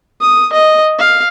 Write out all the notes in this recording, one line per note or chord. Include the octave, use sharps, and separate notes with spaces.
D#6
D#5
F5